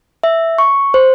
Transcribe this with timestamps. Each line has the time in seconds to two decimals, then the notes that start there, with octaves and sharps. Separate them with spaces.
0.23 E5
0.58 C#6
0.94 C5